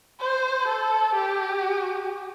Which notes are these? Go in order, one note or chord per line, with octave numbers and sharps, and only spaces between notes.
C5
A4
G4